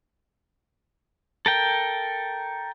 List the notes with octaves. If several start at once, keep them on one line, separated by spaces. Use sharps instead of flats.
A4 A#4 G5